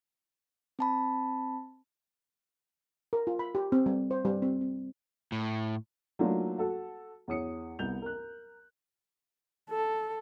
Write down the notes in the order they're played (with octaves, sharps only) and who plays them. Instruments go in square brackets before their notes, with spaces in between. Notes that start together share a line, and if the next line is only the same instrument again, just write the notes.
[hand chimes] C4 A5 B5
[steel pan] A#4
F4
B5
G4
C4
G3
C5
G3
C4
C4
[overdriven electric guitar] A2
[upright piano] F#3 A3 A#3 D4 D#4 F4
F#4 A4
E2 C#5 D#6 C#7
C2 B3 G6 F7
A#4 F#6
[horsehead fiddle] A4